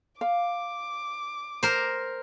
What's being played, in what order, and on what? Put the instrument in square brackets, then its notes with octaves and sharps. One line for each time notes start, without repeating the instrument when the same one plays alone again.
[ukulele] F5 [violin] D6
[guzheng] A#4 C5